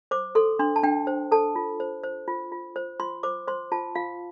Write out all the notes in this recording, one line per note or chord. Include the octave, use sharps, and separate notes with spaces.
C5 D6
A4 C6
D4 C6
A5
D4 G5
C5
A4 A5
F4
C5
C5
F4
F4
C5
F4 C6
C5 D6
C5 C6
F4 A5
F4 F5